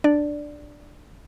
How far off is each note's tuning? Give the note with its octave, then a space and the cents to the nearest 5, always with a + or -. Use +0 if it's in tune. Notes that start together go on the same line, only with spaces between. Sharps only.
D4 +10 D5 +0